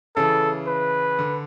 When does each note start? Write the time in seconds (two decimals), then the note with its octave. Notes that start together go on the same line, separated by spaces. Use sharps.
0.16 C#3 E3 A4
0.67 B4
1.19 D3